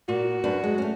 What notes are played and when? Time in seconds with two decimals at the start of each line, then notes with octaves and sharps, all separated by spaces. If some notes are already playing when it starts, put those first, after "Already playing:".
0.09 A#2 F#4
0.44 F#2 D4 B4
0.64 G#3
0.78 A3 C#4